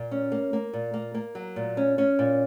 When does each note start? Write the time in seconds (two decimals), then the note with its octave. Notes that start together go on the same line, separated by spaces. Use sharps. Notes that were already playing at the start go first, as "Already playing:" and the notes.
Already playing: A#2
0.11 C#4
0.32 A#3
0.53 A#3
0.73 A#2
0.94 A#3
1.15 A#3
1.35 F#3
1.56 A#2
1.77 C#4
1.98 C#4
2.19 A#2